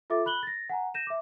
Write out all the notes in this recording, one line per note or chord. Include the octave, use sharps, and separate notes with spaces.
F4 A4 E5 D6 A6
B5 F#6 F#7 G7
A6 A#6
F#5 G#5 A#5
G6 A#6 D#7 E7
E5 D6